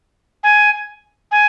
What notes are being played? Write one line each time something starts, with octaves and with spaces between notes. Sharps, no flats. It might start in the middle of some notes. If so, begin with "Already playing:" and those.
G#5
G#5